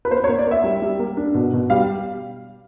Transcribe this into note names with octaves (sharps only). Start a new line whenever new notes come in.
B4
A#3 C5
C#5
A#3
D5
A#3 E5
G3
G3
A#3
D4
B2
B2
G3 F5